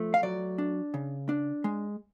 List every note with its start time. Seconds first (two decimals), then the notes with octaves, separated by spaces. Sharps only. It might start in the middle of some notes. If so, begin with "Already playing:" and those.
Already playing: F3 A3
0.14 F5
0.23 F#3 D5
0.58 D4
0.94 C#3
1.29 D4
1.64 G#3